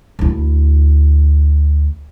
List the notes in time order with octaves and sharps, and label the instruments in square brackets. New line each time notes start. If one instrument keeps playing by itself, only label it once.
[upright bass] D2 E4